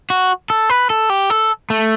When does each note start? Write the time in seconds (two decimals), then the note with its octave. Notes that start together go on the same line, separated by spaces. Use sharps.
0.10 F#4
0.50 A4
0.70 B4
0.90 A4
1.10 G4
1.30 A4
1.70 A3